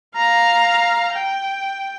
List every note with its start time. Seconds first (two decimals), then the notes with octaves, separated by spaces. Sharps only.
0.16 F5 A#5
1.13 G5